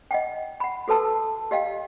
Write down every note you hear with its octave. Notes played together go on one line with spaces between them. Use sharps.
D#5 F#5 G5
F#5 B5
F#4 A4 B4 A5 E6
G4 D#5 F5 G5